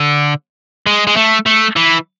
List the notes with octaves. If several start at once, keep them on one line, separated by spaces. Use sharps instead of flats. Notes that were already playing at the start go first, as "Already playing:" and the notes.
Already playing: D3
G#3
G#3
A3
A3
E3